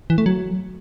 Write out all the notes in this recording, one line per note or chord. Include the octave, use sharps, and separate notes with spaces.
E3
A3
F#3